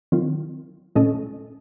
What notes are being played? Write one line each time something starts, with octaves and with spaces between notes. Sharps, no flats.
D#3 F#3 C4 F4
A#2 A3 C#4 A4 D#5